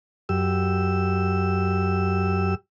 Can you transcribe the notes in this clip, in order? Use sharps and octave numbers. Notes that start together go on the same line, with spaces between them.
F#2 G4 E6